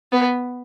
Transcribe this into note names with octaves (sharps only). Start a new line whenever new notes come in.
B3